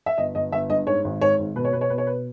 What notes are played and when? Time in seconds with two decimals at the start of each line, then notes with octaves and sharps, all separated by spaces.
0.06 E5
0.18 G1 D#5
0.35 G1 D#5
0.52 G1 E5
0.70 G2 D#5
0.87 G#2 C#5
1.04 G#1
1.21 G#2 C#5
1.39 G#1
1.56 B2 B4
1.65 C#5
1.73 B2 B4
1.81 C#5
1.90 B2 B4
1.98 C#5
2.07 B4